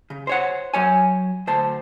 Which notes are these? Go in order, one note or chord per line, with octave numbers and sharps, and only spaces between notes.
C#3
C5 C#5 F#5
F#3 C#5 G#5
D2 C5 A5